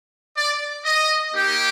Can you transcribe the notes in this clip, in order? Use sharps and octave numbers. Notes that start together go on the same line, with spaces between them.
D5
D#5
A#3 D#4 G4